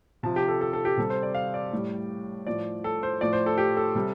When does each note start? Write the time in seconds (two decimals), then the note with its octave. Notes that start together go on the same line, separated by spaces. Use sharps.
0.23 C3 F3 A5
0.36 G4
0.48 A4
0.61 A4
0.73 A4
0.85 G4
0.98 C3 G3 A4
1.10 C5
1.23 D5
1.34 F5
1.54 D5
1.72 A2 G3
2.46 A2 F3 D5
2.84 A4
3.03 C5
3.21 A2 F3 D5
3.33 C5
3.46 A4
3.58 G4
3.77 A4
3.95 C3 G3